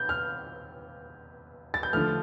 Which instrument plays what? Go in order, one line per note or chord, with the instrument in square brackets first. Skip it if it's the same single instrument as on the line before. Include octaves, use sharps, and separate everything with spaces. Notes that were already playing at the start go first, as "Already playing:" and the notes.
Already playing: [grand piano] G6
F6
A6
G6
D3 F3 A3 F6